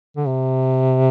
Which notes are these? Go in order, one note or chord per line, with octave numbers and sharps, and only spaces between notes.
D3
C3